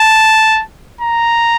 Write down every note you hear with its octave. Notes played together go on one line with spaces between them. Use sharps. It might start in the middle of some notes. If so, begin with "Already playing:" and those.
Already playing: A5
A#5